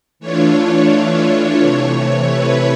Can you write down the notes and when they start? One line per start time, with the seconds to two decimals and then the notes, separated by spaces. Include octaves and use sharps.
0.19 E3 A3 D4 F4 C#5
1.61 C3 E3 A3
2.30 B4